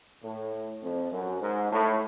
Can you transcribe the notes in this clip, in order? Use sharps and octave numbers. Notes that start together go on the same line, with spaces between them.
A2
F2
F#2
G#2
A2